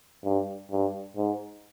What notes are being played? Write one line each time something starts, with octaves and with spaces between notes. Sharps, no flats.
G2
G2
G#2